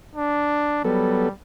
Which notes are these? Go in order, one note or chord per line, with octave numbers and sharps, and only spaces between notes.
D4
F#3 G3 B3 A4